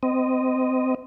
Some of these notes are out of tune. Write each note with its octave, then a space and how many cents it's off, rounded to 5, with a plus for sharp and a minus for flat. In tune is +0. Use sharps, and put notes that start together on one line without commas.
C4 -25 D#5 +0